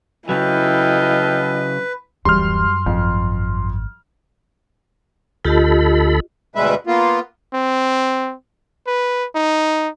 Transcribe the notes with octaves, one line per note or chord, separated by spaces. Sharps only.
C#3 F#3 E4 A4 B4 D#5 F5 G5
D1 F#2 E3 G3 C6 F6
G#1 F2
D2 F4 G4 A4 D#5 B5
D2 B2 G3 G#3 B4 E5
A#3 B3 F4
C4
B4
D#4